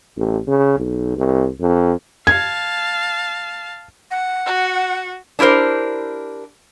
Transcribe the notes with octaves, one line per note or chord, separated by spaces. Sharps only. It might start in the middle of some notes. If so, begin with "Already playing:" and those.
A1
C#3
B1
C2
F2
F5 A5 G#6
F#5
F#4
D4 E4 G4 A#4 C5